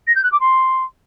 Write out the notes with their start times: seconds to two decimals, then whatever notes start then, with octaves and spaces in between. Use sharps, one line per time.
0.07 A#6
0.15 G6
0.23 F#6
0.32 D6
0.40 C6